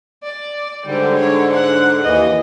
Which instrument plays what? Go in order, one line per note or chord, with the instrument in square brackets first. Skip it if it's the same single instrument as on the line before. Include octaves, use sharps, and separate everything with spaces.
[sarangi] D5
[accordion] G#2 D3 [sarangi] G3
[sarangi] C#5
F#5
[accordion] D#2 E3 [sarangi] D#5